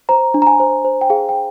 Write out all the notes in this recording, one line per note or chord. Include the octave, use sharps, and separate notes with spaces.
C5 A#5
D4
A#5
G#5
C5
C5
G5
G#4 F5
G5